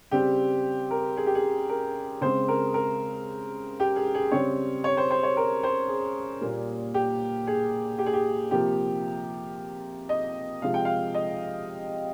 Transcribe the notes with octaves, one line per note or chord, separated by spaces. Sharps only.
C#3 G3 C4 G4
A#4
G#4
G4
G#4
A#4
C#3 G#3 C4 C5
A#4
A#4
G4
G#4
G#4
C#3 G3 C4 C#5
C#5
C5
C5
C#5
A#4
C5
G#4
A#2 G3 A#3
G4
G#4
G4
G#4
G4
C3 F3 A#3 G4
D#5
C3 F3 G#3 F5
G5
F5
D#5